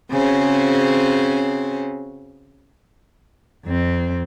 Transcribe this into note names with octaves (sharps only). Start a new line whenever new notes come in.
C#3 C4 C#4 F#4 G#4 C5
F2 C4